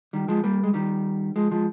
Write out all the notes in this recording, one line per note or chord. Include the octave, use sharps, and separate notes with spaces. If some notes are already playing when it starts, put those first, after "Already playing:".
D#3 G3
F3 G#3
G3 A#3
G#3
D#3 G3
F3 G#3
F3 G#3